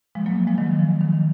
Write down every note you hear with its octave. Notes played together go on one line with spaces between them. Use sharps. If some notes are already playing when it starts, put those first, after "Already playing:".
F3 G#3
F#3 A#3
F3 G#3
D#3 F#3
F3
D#3